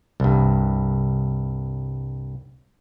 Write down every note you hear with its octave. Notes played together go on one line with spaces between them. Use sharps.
C2 G2